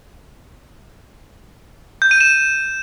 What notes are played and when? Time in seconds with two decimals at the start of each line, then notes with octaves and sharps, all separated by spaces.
2.02 G6
2.11 D#7
2.21 E7